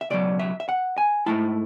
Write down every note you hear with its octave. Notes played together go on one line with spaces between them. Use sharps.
E5
C#2 B2 F#3 D5
E5
E5
F#5
G#5
G#2 E3 A3 E4 A5